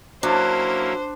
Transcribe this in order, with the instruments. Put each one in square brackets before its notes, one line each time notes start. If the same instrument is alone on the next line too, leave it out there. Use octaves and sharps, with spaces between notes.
[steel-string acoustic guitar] F#3 [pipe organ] A#3 C#4 E4 [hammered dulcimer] D4 [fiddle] C5